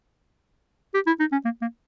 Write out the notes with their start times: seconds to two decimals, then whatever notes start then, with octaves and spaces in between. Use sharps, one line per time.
0.94 G4
1.07 E4
1.20 D#4
1.32 C#4
1.45 A#3
1.62 A#3